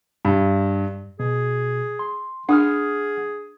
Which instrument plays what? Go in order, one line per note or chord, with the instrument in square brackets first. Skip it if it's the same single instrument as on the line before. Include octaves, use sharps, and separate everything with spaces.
[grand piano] G2
[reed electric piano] B2 [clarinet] G#4
[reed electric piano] C6
[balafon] D4 [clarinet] G#4 [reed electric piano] F#5 D#6 F6